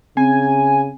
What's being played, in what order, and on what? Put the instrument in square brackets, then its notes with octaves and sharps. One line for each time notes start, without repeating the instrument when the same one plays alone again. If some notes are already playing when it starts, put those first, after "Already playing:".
[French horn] C#3 [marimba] C4 [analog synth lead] G#5